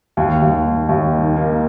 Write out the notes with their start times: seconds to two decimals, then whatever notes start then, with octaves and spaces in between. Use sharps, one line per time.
0.17 D#2
0.42 D#2
0.65 D#3
0.89 D#2
1.13 D#3
1.36 A#3